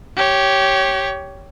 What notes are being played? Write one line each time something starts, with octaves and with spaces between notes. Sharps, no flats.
G4 C#5